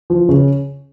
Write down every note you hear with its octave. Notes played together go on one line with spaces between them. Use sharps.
F3
C#3